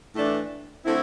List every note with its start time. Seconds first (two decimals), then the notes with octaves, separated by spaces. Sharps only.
0.15 A2 E3 A3 D4
0.84 D3 A3 C4 E4